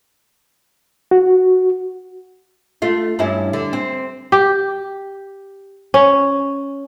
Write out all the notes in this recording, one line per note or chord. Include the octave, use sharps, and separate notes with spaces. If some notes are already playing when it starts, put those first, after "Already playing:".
F#4
A3 F4
G2 C#4 E4
D3
C4
G4
C#4